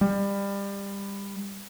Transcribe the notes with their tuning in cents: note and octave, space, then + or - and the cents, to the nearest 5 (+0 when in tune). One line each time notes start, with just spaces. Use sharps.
G3 +25